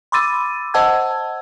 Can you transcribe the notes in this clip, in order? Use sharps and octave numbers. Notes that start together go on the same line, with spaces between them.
B5 C6 D6 E6 A6 D#7
C5 D#5 F#5 A5 E6 G#6